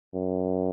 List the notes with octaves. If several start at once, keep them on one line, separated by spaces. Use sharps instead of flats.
F#2